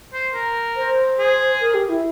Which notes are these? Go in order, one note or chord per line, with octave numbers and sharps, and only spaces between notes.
C5
A#4
C5
G#4
A#4
G4
E4